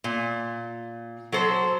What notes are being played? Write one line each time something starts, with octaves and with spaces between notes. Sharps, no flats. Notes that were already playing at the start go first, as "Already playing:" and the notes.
A#2
F#3 A4 C5